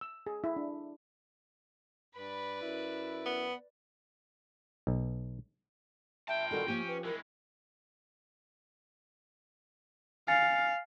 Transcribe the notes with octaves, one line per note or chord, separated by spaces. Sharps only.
E6
G#4
E4
D4
G2 B4 D5 B5
F#2 E4
B3
B1
A#2 E5 G5 A5
D#3 G3 F#4 A4
F3 A#3 C#4 G4
B4
E3 G#3 A#4
F5 G#5 A6 C#7